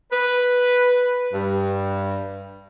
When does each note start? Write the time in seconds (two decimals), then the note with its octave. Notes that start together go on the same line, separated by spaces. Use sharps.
0.12 B4
1.33 G2